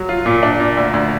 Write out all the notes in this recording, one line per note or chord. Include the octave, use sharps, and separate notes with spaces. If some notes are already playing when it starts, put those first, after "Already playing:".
Already playing: F#3
F4
A#2
D4
A#2
D2
D2